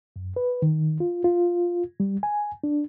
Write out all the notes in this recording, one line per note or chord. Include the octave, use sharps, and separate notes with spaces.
F#2
B4
D#3
F4
F4
G3
G#5
D4